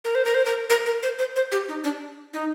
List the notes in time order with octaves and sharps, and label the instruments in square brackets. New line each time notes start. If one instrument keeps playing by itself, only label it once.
[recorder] A#4
C5
A#4
C5
A#4
A#4
A#4
C5
C5
C5
G4
D#4
D4
D#4